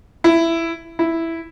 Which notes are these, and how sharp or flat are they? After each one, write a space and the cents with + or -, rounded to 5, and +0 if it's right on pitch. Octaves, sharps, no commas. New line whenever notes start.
E4 +10
E4 +0